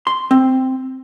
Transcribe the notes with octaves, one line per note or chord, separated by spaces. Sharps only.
C6
C4